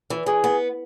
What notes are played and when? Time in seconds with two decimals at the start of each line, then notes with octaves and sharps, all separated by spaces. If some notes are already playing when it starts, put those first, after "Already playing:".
0.10 E3
0.26 E3 G#4
0.44 B3